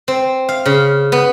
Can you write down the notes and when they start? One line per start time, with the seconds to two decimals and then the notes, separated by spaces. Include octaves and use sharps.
0.08 C4
0.49 F5
0.65 C#3
1.12 B3